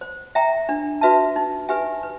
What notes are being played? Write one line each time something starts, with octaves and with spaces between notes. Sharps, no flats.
C5
E5 G5 A#5
D4
F#4 B4 E5 A5
D#4
G4 B4 E5 G#5
B4